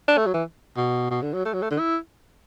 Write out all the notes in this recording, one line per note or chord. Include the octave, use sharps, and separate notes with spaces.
D4
A3
F#3
E3
B2
B2
D3
F#3
A3
F#3
A3
D3
E4